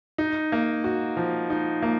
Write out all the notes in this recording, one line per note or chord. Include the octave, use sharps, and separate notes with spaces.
D#4
A#3
F#4
F3
D#4
A#3